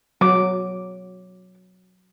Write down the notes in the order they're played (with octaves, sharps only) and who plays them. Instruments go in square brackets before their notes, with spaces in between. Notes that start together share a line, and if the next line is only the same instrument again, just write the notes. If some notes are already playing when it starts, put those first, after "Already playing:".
[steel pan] F#3 [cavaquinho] D6